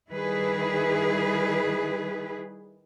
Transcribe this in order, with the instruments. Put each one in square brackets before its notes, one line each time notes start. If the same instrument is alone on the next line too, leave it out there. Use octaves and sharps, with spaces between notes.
[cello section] D#3 G3 E4 G#4 B4